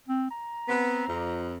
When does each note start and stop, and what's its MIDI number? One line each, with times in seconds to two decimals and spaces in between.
0.09 0.28 60
0.31 1.50 82
0.68 1.03 59
0.68 1.03 60
1.07 1.57 41